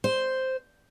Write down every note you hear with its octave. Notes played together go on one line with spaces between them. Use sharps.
C5